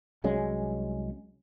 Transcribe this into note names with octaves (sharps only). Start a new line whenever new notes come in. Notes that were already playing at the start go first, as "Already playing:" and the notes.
C2 F#3 G#3 C#4